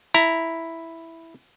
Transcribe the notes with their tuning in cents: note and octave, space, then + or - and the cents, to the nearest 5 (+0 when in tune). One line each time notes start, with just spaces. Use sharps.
E4 +0 A#5 -5